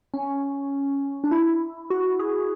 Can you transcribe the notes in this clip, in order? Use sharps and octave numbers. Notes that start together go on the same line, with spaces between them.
C#4
D4
E4
F#4
G#4